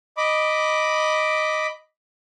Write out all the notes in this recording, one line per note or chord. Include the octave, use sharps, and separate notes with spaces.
D#5 B5 D6